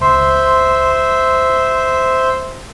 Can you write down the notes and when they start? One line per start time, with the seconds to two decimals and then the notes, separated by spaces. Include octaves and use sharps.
0.01 C#2 C5 E5 C6